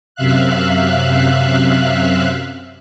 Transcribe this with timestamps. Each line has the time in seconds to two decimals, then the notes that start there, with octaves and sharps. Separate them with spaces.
0.15 F#2 C3 E5 F5 F#6